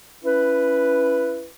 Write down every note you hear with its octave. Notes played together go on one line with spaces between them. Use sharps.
C#4 E4 B4